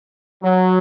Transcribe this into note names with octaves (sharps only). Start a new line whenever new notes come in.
F#3